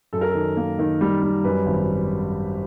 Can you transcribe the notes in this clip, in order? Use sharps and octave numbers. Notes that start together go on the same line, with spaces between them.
F#2 A4
A#4
A4
D#3
A#3
D#3
G3
G3
F#2 B4
G#1